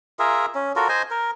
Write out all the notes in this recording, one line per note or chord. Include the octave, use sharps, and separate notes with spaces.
F4 G#4 A#4 E5
C#4
F4 F#4 A4 A#4
C5 D#5 G#5
A#4